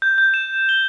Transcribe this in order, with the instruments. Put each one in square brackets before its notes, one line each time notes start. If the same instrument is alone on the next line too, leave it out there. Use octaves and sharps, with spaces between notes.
[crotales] G6
G6
E7
G7